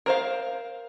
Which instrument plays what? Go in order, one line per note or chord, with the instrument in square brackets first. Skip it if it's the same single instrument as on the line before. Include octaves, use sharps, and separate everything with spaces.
[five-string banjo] A#4 C5 F5